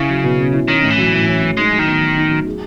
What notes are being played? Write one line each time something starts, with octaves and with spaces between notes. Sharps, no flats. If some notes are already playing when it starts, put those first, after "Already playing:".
Already playing: C#3 C#4 E4
F#3
B2
C#4
E4
D#3 C#4
A2
E3
F#3
A2
C#4
A2
G#3 D#4
F#3
D#3
B3
F#3
D#4
F#3
G#4